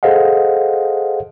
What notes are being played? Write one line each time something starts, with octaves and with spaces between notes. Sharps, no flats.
G#4 A4 C5 D#5 F5 F#5